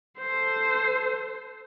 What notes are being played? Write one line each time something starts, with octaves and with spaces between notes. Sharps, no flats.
A4 C5